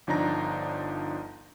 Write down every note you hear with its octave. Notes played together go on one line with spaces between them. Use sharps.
G1 F3 D4 D#4 A#5 A#6